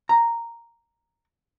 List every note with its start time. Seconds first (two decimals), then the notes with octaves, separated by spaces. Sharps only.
0.09 A#5